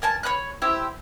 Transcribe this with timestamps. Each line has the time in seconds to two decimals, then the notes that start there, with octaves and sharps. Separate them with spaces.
0.02 A#4 G#5 A5
0.23 C#5 D#5 B5 F#6
0.62 E4 G4 C5 E5